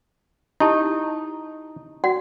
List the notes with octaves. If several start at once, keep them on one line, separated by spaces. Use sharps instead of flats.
D#4 E4 G4 A5
F#4 D5 F#5